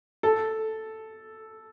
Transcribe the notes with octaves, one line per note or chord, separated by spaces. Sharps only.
A4